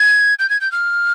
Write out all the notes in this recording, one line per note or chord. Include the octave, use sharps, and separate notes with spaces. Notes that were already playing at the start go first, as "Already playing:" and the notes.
Already playing: G#6
G6
G#6
G6
F6